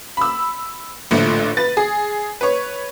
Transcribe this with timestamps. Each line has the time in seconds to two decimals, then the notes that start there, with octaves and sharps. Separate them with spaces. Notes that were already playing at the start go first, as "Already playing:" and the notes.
0.17 B5 E6
1.11 A1 A#2 D3 F3 A3
1.57 B4 A6
1.77 G#4
2.41 B4 C#5